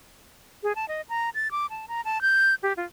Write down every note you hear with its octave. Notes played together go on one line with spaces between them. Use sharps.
G#4
A5
D#5
A#5
A6
D6
A5
A#5
A5
G6
G4
F4